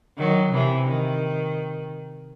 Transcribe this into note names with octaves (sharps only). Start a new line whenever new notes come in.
D#3 F#3
C3 E3
D#3